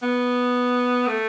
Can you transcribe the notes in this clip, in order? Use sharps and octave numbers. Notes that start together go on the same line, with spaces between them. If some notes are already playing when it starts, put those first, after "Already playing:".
B3
A3